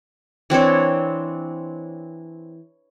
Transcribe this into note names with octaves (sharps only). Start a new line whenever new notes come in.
E3 C4 D4 C#5